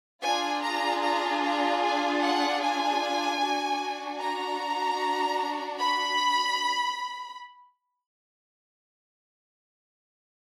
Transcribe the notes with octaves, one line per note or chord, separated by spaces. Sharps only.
D4 F4 G#4 G#5
A#5
A#5
A#5
G#5
F#5
G#5
D4 F#4
A#5
B5